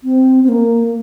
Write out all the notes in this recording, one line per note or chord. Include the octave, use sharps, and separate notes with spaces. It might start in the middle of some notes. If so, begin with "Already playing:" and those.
C4
C4
A#3